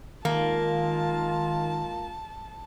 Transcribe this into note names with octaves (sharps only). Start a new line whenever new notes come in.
D#3 G#3 A#3 F4 A5